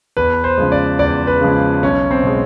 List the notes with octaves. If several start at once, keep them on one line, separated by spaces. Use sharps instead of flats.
E2 B4
C5
C#3 F3 G#3
D5
E2 D5
B4
C#3 F3 G#3
B1 C#4
C4
B2 G#3